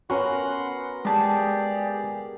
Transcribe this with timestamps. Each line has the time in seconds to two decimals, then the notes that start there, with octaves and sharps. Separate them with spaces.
0.10 B3 C#4 F#4 A#4 F#5 C6
1.05 G#3 G4 G#4 D5 A5